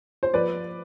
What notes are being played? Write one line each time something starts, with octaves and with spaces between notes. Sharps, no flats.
C5
F3 B4 D5